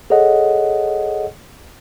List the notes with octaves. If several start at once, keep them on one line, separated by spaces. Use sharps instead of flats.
G#4 A4 C#5 D#5 F#5